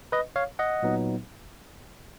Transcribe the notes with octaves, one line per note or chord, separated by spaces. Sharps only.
B4 D#5
C#5 F5
D#5 F#5
A#2 F#3 B3 D#4